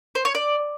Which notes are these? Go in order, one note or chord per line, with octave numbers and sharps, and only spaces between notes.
C5
C#5
D5